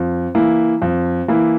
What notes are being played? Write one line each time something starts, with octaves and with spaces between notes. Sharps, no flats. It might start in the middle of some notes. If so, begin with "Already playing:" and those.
Already playing: F2
E3 A#3 E4
F2
E3 A#3 E4